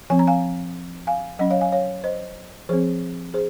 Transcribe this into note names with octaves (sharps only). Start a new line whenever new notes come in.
F3 C4 G#5
A#5
F5 G#5
F5 G#5
F#3 C#4 D#5 F#5
C#5 F5
F5 G#5
C#5 F5
C5 D#5
F3 C4 G#4 C5
G#4 C5